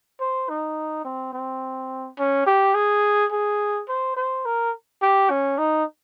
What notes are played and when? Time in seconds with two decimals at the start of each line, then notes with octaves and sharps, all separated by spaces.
0.20 C5
0.49 D#4
1.05 C4
1.33 C4
2.19 C#4
2.46 G4
2.75 G#4
3.31 G#4
3.89 C5
4.16 C5
4.45 A#4
5.02 G4
5.30 C#4
5.58 D#4